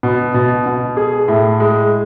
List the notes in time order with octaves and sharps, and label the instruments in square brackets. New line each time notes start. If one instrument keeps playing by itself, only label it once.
[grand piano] B2
B2
B2
G#4
A2
G#3